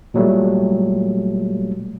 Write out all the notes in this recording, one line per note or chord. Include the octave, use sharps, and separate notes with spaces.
A#2 F#3 G3 A3